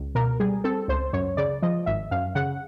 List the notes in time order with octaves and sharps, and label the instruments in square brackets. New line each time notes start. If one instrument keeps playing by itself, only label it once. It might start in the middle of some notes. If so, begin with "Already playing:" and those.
Already playing: [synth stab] C#2
B2 A#4
G3 G#4
C4 A4
C#2 C5
F#2 C#5
C#3 D5
F3 D#5
G#1 E5
F#2 F5
C#3 F#5